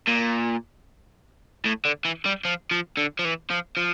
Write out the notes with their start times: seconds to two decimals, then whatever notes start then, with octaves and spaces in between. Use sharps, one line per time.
0.07 A#2
1.66 A2
1.85 D3
2.05 E3
2.26 G3
2.45 F3
2.71 F3
2.97 D3
3.19 F3
3.25 E3
3.50 F3
3.77 F3